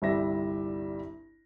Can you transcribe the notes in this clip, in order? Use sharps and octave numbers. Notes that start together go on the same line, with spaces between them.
G1 C2 G3 D5 E5 A#6